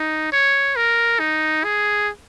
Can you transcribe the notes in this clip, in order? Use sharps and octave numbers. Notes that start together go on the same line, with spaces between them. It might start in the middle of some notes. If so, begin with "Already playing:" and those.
Already playing: D#4
C#5
A#4
D#4
G#4